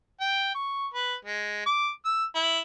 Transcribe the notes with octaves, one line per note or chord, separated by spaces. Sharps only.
G5
C#6
B4
G#3
D6
E6
E4